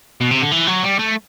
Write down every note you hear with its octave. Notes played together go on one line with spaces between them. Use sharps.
B2
C3
D3
E3
F#3
G3
A3